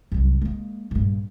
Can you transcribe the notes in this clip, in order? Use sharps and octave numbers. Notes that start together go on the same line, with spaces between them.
C2 F#2
G#3 A#3
A#1 G2